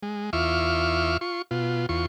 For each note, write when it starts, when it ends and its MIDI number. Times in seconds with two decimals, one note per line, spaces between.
0.03 0.30 56
0.33 1.17 40
0.33 1.17 65
0.33 1.17 76
0.33 1.17 85
0.33 1.17 86
0.33 1.17 89
1.21 1.42 65
1.21 1.42 85
1.51 1.86 47
1.51 1.86 65
1.89 2.06 40
1.89 2.06 65
1.89 2.06 85